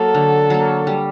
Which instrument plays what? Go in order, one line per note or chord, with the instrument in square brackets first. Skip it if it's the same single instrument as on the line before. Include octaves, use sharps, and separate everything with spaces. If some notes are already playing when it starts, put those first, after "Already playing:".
Already playing: [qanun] F#3 A#3 [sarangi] A4
[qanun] D3
F#3 A#3
G3